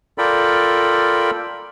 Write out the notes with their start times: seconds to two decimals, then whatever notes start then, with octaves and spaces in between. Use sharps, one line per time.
0.18 F4 A4 A#4 D5 G5 B5